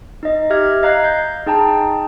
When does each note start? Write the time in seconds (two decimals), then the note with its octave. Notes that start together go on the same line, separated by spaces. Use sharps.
0.23 D#4 D#5
0.50 G4 D#5 E5 F6 G#6 A#6
0.83 D#5 F5 A#5 F#6 G#6 C7
1.04 G6
1.46 D#4 G#4 G5 A5 A#5